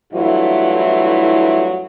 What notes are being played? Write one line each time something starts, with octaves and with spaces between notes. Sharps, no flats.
G2 E3 F#3 A3 E4 F4